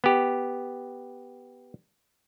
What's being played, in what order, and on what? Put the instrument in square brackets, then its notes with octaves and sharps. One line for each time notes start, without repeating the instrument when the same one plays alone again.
[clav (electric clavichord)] B3 G4